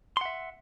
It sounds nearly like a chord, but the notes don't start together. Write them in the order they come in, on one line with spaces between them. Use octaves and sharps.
C6 F#5 E5